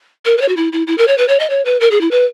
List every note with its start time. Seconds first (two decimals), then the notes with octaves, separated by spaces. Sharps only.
0.25 A#4
0.38 B4
0.41 C#5
0.48 F#4
0.57 E4
0.73 E4
0.87 E4
0.98 A#4
1.08 C#5
1.18 B4
1.28 C#5
1.40 D#5
1.50 C#5
1.65 B4
1.80 A#4
1.91 G#4
2.01 E4
2.11 B4